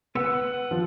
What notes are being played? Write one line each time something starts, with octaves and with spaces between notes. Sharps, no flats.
B3 B4 E6
F#5
F3